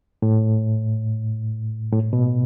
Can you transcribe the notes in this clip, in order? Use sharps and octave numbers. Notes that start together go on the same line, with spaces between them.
A2
A2
B2